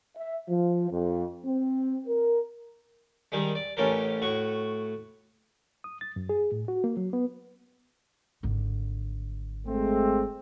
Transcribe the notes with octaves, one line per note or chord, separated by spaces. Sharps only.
E5
F3
F2
C4
A#4
D#3 G3 G#3
D5
A1 A2 C#4 G4 A4 A#4
A2 F#4 C#6
D#6
A6
F#2
G#4
A2
F#4
A#3
F#3
B3
G#1 D3
G#3 A3 C4